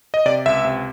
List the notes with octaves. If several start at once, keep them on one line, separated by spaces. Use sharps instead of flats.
D#5
C3 D5
C#2 E5
C3